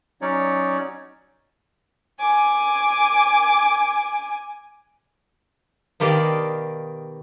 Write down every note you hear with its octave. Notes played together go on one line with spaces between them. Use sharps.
F#3 C#4 D#4 C#5 D5
G#5 D6
B2 D#3 G4 D5 D#5 F5